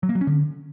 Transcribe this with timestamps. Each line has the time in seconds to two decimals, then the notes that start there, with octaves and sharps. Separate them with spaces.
0.03 F#3
0.09 A#3
0.15 F#3
0.21 C#4
0.27 D3